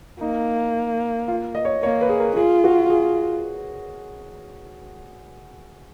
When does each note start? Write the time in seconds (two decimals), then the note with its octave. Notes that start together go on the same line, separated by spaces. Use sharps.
0.20 A#3 D#4
1.28 F4
1.55 D#5
1.65 C#5
1.83 A#3 C#5
2.01 B4
2.09 G#4
2.19 A#4
2.36 F4 G#4
2.64 F#4
2.90 G#4